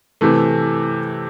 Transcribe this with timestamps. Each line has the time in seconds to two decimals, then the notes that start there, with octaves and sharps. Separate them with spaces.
0.21 C3 E3 A3